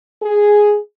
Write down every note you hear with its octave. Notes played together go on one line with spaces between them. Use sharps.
G#4